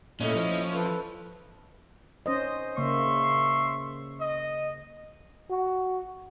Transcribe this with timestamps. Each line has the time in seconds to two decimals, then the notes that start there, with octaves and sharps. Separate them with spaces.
0.20 A#2 A3 C#4 E4 D#5
0.35 F3
0.74 A4 B4
2.26 C#4 C5 D#5
2.78 C#3 A#3 E5 C6 C#6
4.20 D#5
5.50 F#4